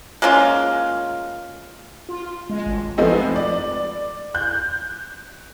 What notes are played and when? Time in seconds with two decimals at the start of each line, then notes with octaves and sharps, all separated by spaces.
0.22 G#3 A#3 C#4 F4
2.09 F4
2.49 G#3
2.66 G#1
2.98 F3 G#3 A3 B3 C4 D#4
3.36 D5
4.35 F#6 G6